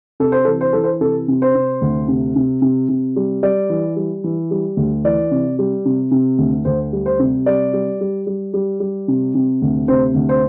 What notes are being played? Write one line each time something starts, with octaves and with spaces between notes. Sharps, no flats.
C3 A4
C5
E3 A4
C5
E3 A4
C5
C3 A4
C3
C5
C3
D2
C3
C3
C3
C3
G3
G3 D5
E3
G3
E3
G3
D2
E3 D5
C3
G3
C3
C3
D2
D2 C5
G3
C5
C3
G3 D5
G3
G3
G3
G3
G3
C3
C3
D2
C3 C5
D2
C5